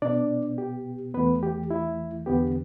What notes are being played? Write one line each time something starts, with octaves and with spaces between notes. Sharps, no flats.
B2 B3 D4 D5
G4
E2 E3 A3 B3 B4
G4
E4
E2 D3 B3 G4